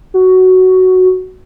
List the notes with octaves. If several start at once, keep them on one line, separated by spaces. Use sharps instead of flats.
F#4